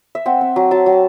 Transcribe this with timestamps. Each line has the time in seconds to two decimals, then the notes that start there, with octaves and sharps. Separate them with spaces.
0.15 E5
0.26 C4 F#5
0.41 C4
0.56 F#3
0.71 F#3 A5
0.86 F#3